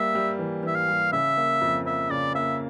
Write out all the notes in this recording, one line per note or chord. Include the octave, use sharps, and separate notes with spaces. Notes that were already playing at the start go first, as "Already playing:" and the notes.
Already playing: G3 A#3 E5
G3
E3
E3 E5
F5
G3
C#3 E5
A#3
F2
A#3 E5
C#3 D5
A#3 E5